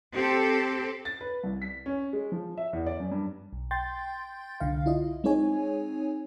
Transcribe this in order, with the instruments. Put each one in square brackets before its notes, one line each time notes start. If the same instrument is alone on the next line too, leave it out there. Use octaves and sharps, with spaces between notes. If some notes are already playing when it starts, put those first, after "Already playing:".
[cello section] C4 G4 A4
[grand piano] A6
B4
C2
B6
C#4
G#3
F3
E5
E2
D5
F#2
G2
[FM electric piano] B1
G5 C6 G6 A6
C2 D3 F5
E4 F4 D#5
G#3 C4 D#4 G#4 C#5 G#5